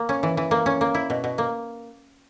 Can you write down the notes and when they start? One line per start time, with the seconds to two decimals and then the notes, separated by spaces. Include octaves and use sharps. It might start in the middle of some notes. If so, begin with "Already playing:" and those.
Already playing: A#3
0.09 C#4
0.23 E3
0.37 E3
0.51 A#3
0.66 C#4
0.81 A#3
0.95 E4
1.10 B2
1.24 B2
1.38 A#3